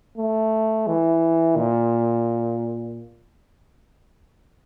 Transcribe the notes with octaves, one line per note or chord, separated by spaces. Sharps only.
A3
E3
A#2